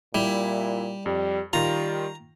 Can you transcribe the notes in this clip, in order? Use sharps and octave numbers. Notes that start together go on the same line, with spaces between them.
A#2 G3 E4
F2 G3
D#3 G3 F4 A#5